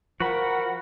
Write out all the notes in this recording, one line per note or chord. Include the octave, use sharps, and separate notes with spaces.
F3 F#4 A#4 F#5 B5